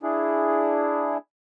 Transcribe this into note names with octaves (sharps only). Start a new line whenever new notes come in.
D4 E4 G#4